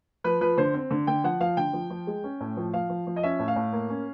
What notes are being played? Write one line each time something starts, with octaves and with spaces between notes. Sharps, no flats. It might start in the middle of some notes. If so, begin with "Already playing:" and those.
F3 B4
F3 B4
D3 C5
C4
D3
D3 G5
F3 F#5
F3 F5
D3 G5
F3
F3
G#3
C#4
A2
F3
F3 F5
F3
F3
D#5
C#4 E5
A2
F5
A2
A#3
C#4